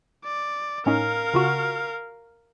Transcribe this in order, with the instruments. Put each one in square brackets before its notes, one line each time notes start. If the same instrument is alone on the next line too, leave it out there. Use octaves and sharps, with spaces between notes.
[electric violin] D5
[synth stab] A2 C#4 D#4 [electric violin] A#4 F5
[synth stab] C#3 F4 F#4